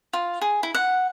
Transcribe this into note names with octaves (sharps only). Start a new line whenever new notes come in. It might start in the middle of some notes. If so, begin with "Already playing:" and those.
F4
G#4
E4
F#5